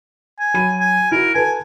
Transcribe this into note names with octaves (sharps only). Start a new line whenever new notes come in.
G#5
F#3 B5 D#7
G#5
E4 F#4 A#4
A4 B4 G#5 A5